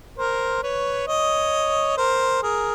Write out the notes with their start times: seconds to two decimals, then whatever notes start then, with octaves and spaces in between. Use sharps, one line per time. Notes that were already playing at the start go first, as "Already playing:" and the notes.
0.18 A#4 C5
0.63 B4 C#5
1.08 C#5 D#5
1.97 A#4 C5
2.42 G#4 A#4